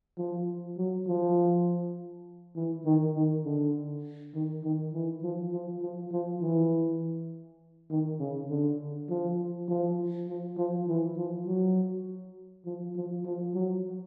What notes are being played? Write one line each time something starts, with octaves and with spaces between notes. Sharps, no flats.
F3
F#3
F3
E3
D#3
D#3
D3
D#3
D#3
E3
F3
F3
F3
F3
E3
D#3
C#3
D3
F3
F3
F3
F3
E3
F3
F#3
F3
F3
F3
F#3